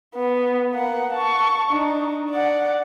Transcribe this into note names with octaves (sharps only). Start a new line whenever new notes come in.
B3
A#3 F#5
A5 C#6
D4 D#4
D5 F#5